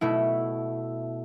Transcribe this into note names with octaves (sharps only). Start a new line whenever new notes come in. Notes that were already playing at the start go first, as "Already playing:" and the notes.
B2 A3 E4